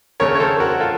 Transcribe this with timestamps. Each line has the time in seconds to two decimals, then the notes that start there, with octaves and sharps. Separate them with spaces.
0.20 D#2 C#3 A3 A#4 C#5
0.35 C#5
0.40 A4 C5
0.60 F#4 A#4
0.80 F4 A4